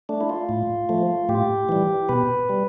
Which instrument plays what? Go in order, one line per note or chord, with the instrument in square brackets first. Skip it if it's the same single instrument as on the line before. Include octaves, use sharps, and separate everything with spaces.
[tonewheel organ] A3 D4
E4
F4
A2
F3 A3
A2 G4
E3 G3
B2 B4
G3